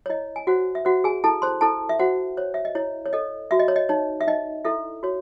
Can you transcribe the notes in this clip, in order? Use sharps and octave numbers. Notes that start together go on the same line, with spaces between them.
C#5
E4 D#5
G#5
F#4 C5 F#5
E5
F#4 C5 F#5
G#4 G#5
E4 A4 A5
C5 C6
E4 A4 A5
E5
F#4 C5 F#5
C5 C#5
E5
D#5
E4 C#5
C#5
A4 D#5
F#4 E5
D#5
C#5
D#5
D#4 C#5
E5
D#4 D#5
E4 A4 E5
F#4 C#5